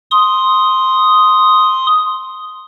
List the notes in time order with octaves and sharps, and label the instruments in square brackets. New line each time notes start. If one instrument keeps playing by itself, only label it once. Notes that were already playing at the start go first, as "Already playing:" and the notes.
[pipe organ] C6 D#6